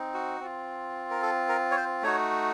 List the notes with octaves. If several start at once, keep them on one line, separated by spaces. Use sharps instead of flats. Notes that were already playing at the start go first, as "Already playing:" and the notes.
Already playing: C4 D#4
F#4
C4 F4
A#4
A4
A#4
C#5
C5
A3 D#4 F#4 C#5